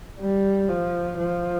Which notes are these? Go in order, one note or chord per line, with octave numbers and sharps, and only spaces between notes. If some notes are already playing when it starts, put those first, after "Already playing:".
G3
F3
F3